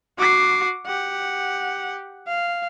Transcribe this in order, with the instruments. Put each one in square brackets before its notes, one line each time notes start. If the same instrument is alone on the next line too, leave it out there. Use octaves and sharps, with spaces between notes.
[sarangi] F#4 [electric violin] D6 C7
[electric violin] G4 [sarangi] F#5
[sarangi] F5